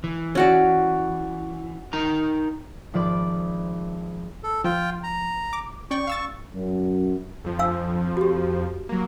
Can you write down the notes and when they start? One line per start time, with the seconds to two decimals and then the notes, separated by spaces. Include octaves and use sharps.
0.04 E3
0.35 C#4 F#4 D5
1.93 D#4 A#4 A#5
2.93 G#1 F3 F4 D5 B5 D6
4.43 A4
4.64 F3 F4 G5
5.03 A#5
5.53 D6
5.91 C#4 D5 G5 C#6
6.07 F5 E6 A6
6.54 F#2
7.44 F2 F3
7.59 D4 F5 E6
8.17 F#4 G4
8.89 F#3 A#3